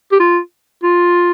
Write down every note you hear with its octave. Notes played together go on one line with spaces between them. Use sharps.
G4
F4
F4